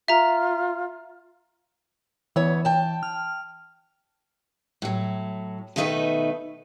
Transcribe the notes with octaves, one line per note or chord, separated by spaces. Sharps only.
F4 E5 A#5
D2 E3 B3 C#5
G5 A5
F6
A2 F#3
B2 D#3 A3 D#4 B4 E5